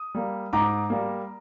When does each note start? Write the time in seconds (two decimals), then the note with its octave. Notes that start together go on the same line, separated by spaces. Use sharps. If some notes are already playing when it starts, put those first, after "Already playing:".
Already playing: D#6
0.15 G3 A#3
0.53 G#2 A#5 D6
0.90 G3 A#3